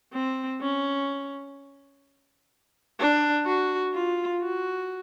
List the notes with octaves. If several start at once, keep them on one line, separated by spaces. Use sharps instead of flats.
C4
C#4
D4
F#4
F4
F#4